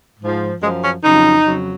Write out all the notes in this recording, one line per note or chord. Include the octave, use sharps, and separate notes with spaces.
G#2 F3
F#2 F3 G#3
C#4
F2 C#3 F#3 D#4
F2 C#3 F#3